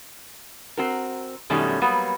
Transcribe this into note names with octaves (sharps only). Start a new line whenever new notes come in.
C4 F#4 A#4
F#2 B2 D#3 G3 A3 C#4
F#3 G3 A#3 B3 F#4